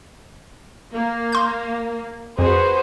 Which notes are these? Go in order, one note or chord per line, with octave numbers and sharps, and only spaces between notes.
A#3
C6 G6
F2 F#4 G#4 B4 C5